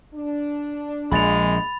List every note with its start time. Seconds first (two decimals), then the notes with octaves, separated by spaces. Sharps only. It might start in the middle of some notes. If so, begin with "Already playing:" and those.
0.13 D4
1.12 A#1 A#2 G#3 B5 A6 F7